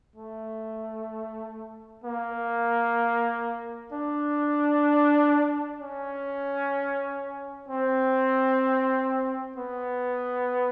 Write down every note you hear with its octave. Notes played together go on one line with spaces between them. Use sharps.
A3
A#3
D4
C#4
C4
B3